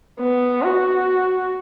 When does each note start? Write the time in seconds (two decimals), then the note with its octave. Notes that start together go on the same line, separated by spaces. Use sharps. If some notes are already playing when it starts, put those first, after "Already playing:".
0.20 B3
0.63 F#4